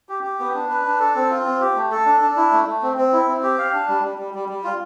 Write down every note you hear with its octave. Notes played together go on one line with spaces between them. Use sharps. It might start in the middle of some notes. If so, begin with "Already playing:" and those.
G4
G4
B3
D4
B4
D4
A4
C4
F4
C4
G4
A3
A4
D4
D4
E4
A3
A3
C4
C4
E4
C4
G4
F5
D4
G3
G3
G3
G3
G3
F4